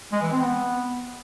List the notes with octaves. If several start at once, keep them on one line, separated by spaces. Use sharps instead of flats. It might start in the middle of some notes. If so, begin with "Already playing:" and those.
G#3
E3
C4
B3